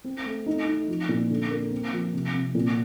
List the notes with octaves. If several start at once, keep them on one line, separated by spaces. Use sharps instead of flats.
C4
A3
D#4
D#4
F3
A#2
D3
A#3
C4
F3
C3
C3
A#2